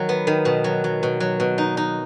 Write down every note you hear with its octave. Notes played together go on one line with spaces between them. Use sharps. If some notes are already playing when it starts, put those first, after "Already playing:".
Already playing: D#3 F#3
B3
D#3
B2
F#3
F#3
B2
F#3
B2
D#4
D#4